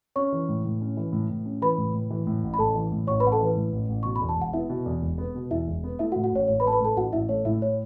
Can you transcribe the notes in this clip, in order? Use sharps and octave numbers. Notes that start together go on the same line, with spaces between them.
C#4 C#5 C#6
E3
A2
A2
C#4
E3
A2
A2
C#4
E3 B4 B5
A2
A2
E3
A2
A1
B5
A1 A4 A5
E3
A2
A1 C#5 C#6
B4 B5
A1 F#5
A4 A5
E3 B4
A2
A1
A1
B2 C#6
B5
E2
A5
E1 F#5
B3 E4 E5
B2
E2
E1
B3
B2
E2 E4 E5
E1
B3
A3 E4 E5
F#4 F#5
A2
F#4 F#5
A1 C#5
A1 C#5
B4 B5
A3 A5
B4 B5
A2 A4 A5
A1 F#4 F#5
A1 E4 E5
A3 C#5
A2 E4 E5
C#5